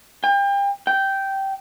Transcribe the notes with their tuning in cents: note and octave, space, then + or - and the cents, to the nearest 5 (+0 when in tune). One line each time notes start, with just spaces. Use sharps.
G5 +35
G5 -10